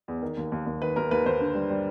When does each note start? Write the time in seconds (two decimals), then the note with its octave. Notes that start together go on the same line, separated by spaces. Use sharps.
0.08 E2
0.22 D#3
0.37 D#2
0.52 D#2
0.66 D#2
0.82 D#3 B4
0.96 D#2 A#4
1.11 D#2 B4
1.25 D#2 C5
1.40 D3
1.55 G3
1.70 G3